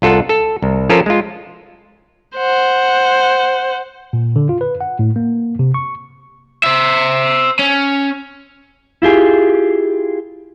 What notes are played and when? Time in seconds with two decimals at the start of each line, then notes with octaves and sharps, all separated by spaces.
0.02 C2 F4 A4 F#5
0.29 A4
0.62 C2
0.89 F3 C#4 F4 A4 A#4
1.06 G#3 F4
2.37 C5 F#5
4.13 A#2
4.36 D3
4.49 F4
4.61 B4
4.81 F#5
4.99 A2
5.16 A#3
5.59 C3
5.74 C#6
6.64 C5 E5
7.59 C#4
9.02 E4 F4 G4 G#4